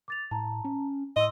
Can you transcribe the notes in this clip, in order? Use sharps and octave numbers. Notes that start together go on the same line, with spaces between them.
D6 A6 F7
A2 A5 A#5
C#4
A2 D#5 C6 E6